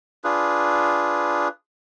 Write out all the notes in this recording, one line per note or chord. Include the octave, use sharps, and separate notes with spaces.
D4 F4 G#4 B4